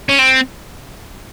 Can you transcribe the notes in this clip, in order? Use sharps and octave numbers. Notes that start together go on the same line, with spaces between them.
C#4
C4